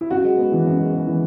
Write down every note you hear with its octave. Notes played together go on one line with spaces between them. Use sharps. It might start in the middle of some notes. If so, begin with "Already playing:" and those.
E4
F#2 F#4
G#3
B3
E3
F#2
G#3
B3
E3